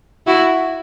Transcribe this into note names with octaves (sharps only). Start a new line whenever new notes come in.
E4 F#4